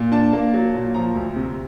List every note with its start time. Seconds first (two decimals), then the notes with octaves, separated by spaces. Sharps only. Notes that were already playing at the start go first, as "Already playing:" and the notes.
Already playing: A#2
0.12 D4 A5
0.33 A#3
0.54 F#3
0.74 A#2
0.94 F3 A#5
1.15 D2
1.36 C3